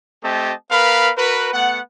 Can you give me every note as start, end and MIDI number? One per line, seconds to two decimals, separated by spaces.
0.24 0.53 57
0.24 0.53 60
0.24 0.53 67
0.24 0.53 75
0.24 0.53 81
0.71 1.12 59
0.71 1.12 70
0.71 1.12 71
0.71 1.12 77
0.71 1.12 83
1.18 1.52 66
1.18 1.52 70
1.18 1.52 71
1.54 1.80 57
1.54 1.80 59
1.54 1.80 78